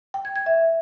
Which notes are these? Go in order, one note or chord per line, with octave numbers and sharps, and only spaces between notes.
G5
G#6
G#6
E5